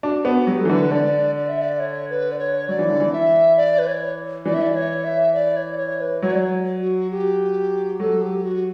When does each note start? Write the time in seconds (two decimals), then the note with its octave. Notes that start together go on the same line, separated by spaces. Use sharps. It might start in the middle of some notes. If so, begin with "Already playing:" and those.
0.03 D4 F#4
0.25 B3 F#4
0.47 F#3 G4
0.60 A4
0.65 E3
0.69 D3 B4
0.91 D3 D5
1.36 D5
1.49 E5
1.62 D5
1.80 C#5
2.10 B4
2.32 D5
2.39 C#5
2.68 F#3 D5
2.79 E3
2.89 D3
3.00 E3
3.13 E5
3.57 D5
3.79 B4
3.87 C#5
4.45 E3 D5
4.54 E5
4.62 D5
4.75 C#5
5.04 E5
5.34 D5
5.56 C#5
5.72 D5
5.78 C#5
6.01 B4
6.22 F#3 C#5
6.32 D5
6.41 C#5
6.81 F#4
7.11 G4
7.99 F#3 A4
8.22 G4
8.43 F#4